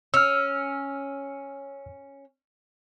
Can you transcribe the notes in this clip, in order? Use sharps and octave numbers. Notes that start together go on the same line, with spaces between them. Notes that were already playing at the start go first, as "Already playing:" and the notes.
C#4 E6 F6